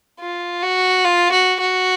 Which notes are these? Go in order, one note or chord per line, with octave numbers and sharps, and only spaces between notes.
F4
F#4
F4
F#4
F#4